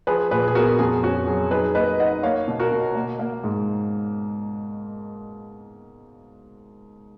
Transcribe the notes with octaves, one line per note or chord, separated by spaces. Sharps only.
F3 G#4 B4
A#2 G#4 B4
G#4
B3 F#4 A#4
F2 G#4
C#4 F#4
F#3 G#4
D#4 G#4 B4
A#3 B4 D#5
D#4 D#5 F#5
A#3 C#5 F5
B2
F#4 A#4
B2
A#3
A#3
G#2